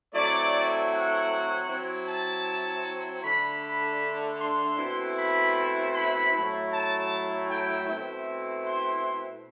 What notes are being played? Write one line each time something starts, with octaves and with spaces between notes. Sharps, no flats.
F#3 A3 C4 E4 D5
F#5
F#3 C4 E4
A5
D3 A3 D4 B5
B5
C6
B2 A3 C4 E4
B5
B5
A2 F#3 A3 E4
A5
G5
B2 A3 C4 E4
C6